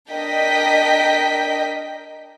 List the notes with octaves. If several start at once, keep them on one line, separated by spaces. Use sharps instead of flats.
D4 A#4 D#5 G5 B6